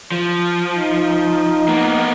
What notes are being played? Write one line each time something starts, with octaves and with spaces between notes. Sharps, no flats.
F3
D#4
A#3 B3